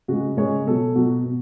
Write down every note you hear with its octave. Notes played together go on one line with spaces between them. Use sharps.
C#3 G#3 F#4
C#3 G#3 C#5
B2 F#3 A4
B2 F#3 F#4
B2